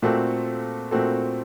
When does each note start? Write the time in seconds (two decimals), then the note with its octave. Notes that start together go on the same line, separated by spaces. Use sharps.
0.02 A#2 A3 C4 F#4 A4
0.91 A#2 A3 C4 F#4 A4